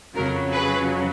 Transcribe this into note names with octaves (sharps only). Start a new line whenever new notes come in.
F2 C#3 F#3 A#4
G#4 B4